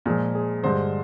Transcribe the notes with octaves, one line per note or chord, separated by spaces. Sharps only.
A#2 F3 G#3 G#4
G#4
G2 D3 G#3 C5